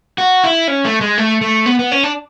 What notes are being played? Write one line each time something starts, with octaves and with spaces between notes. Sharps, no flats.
F#4
E4
C#4
A3
G#3
A3
A3
B3
B3
C#4
D4